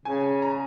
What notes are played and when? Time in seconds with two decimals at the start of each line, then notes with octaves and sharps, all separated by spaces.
0.05 C#3 G#5
0.23 G#5
0.42 A#5